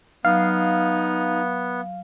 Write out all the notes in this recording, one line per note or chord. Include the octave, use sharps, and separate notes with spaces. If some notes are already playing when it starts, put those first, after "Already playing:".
F#3 B3 D#4 F5